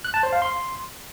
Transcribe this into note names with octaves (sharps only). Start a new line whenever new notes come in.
F#6
A5
C5
F5
C6